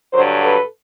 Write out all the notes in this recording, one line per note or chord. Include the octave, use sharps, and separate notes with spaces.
G2 D3 F#3 A#4 C5
A4 B4